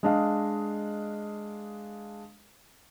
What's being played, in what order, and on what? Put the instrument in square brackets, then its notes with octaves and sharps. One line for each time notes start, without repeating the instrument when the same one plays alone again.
[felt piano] G#3 D4 D#5 F5